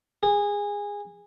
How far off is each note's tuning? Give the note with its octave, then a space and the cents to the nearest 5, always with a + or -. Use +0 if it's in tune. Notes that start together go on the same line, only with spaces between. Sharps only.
G#4 -20